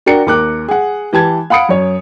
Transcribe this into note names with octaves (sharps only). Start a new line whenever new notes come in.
D4 F#4 A#4 G5 C#7
D#2 A#4 D6 F#6
G#4 F#5
E3 G4 A5 G#6
F5 F#5 B5 D#6 C#7 D7
F#2 C#5